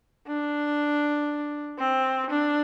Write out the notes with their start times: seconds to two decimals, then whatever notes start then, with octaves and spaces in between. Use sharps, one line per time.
0.27 D4
1.79 C4
2.30 D4